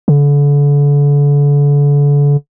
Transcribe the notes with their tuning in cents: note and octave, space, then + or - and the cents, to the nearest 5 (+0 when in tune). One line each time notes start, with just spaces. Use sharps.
D3 -35